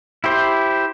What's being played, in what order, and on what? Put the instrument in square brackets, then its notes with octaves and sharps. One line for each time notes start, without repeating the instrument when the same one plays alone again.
[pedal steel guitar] E4 G4 C5